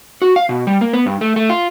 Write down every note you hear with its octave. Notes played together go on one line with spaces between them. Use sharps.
F#4
F5
B2
G3
A#3
B3
G2
A3
A3
F4